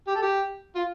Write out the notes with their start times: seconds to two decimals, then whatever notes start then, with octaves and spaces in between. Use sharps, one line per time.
0.07 G4
0.15 A4
0.22 G4
0.75 F4